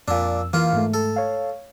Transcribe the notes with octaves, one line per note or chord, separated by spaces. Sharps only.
F2 A#2 D4 E6
E3 A#3 F4
G#2 A3
A4
C#5 F5